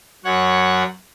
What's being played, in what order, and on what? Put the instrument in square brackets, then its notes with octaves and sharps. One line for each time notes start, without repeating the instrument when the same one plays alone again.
[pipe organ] F#2 C#5 F#5